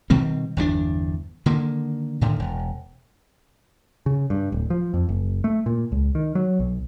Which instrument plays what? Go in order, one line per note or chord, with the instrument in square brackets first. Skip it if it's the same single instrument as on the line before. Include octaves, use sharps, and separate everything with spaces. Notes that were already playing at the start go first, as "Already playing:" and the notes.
[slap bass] B2 D#3 G3 C4
G1 E2 C3 D4
D3 D#3 A#3
A2 D3 D#3
E1
[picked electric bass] C#3
G2
D1
F3
F2
F#1
A3
A#2
C#2
D#3
F#3
B1